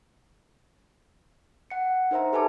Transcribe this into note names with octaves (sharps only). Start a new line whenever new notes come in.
F#5 C#7
D#4 A#4 C5 E5 A#5
G4 A4 B4 G#5 A5 D6